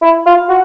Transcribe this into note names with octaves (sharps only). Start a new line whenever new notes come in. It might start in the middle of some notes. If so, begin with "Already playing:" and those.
E4
F4
F#4